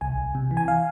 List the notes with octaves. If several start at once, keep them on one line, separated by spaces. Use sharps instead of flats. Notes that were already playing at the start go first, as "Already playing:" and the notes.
C2 G#5
C2
C3
E3
G#5
F5